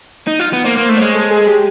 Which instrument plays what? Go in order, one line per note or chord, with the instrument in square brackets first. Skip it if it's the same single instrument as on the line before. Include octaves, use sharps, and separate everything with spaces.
[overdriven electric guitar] D#4
F4
B3
[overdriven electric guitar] A#3 [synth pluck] C5
[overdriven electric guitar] A#3 [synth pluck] C5
[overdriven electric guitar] A3
[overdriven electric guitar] G#3 [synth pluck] C#5
[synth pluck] A4
G#4
G4